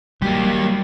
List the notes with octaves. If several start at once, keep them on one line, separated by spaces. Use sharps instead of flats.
F#3 G3 A#3 G4